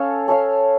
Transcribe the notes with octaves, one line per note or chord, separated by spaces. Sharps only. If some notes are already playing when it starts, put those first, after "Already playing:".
Already playing: C#4 A4 C#5 F5
C#4 A4 C#5 F5